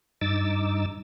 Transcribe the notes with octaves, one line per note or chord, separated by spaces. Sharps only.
G2 D#4 D6 E6 A6